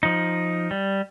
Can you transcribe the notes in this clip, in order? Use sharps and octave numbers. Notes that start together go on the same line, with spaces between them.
F3 D#4
G3